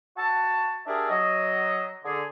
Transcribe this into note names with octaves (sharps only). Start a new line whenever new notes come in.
F#4 A5
D4 G4 G#4 A#4 D5 E5
F#3 D#5
D3 G#4